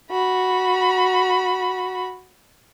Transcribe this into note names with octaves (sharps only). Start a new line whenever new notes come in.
F#4 B5